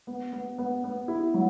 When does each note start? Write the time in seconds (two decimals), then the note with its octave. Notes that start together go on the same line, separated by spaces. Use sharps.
0.07 B3
0.33 B3
0.58 B3
0.84 B3
1.08 E4
1.34 F#3